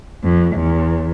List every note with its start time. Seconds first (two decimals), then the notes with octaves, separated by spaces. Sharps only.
0.23 F2
0.55 E2